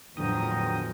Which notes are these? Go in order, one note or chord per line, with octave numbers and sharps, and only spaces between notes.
E2 A2 D3 F3 F#3 G5 A#5 D#6